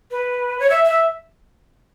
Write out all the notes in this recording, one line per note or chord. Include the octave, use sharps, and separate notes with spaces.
B4
C#5
E5
E5